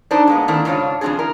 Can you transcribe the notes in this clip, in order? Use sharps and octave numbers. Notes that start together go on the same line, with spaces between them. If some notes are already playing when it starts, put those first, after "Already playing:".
D4 D#4 C5 D5
G#3 A#3 B3
D#3 A3 A#3 C4 D4 E4
G#2 C#3 D4 F4 C#5
C#3 F3 A#3 C4 D4 G#4
E4 A#4